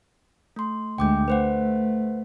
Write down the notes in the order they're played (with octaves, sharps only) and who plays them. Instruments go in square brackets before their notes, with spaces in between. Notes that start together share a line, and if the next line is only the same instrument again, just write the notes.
[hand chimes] A3 C6
[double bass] D2 G#3 [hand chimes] G5 D6 G6
[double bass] A3 [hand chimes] B4 C5 F#5